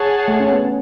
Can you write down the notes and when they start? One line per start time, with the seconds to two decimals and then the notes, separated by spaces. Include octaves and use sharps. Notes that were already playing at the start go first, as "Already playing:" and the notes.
Already playing: G#4 C#5 F#5 A5
0.28 A3
0.40 C#4
0.52 B3
0.65 C#4